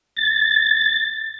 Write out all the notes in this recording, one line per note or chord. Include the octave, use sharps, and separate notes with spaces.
A6